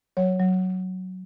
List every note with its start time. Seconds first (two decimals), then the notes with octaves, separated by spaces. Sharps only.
0.17 F#3 C#5
0.40 F#3